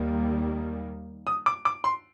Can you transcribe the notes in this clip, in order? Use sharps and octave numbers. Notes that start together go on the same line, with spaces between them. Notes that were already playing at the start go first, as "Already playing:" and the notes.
Already playing: D#2 D#3 G3 A#3
D#6
D6
D6
C6